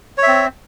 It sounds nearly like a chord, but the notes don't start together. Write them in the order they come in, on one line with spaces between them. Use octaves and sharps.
C#5 E5 C4